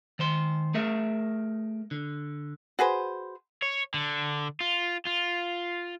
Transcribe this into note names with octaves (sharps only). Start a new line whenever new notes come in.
D#3 C5 C6
A3 G#4 A#4 E5
D3
F#4 G#4 B4 C5
C#5
D3
F4
F4